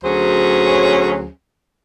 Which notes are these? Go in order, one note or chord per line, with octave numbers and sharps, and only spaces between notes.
D2 F#3 C#4 G#4 C5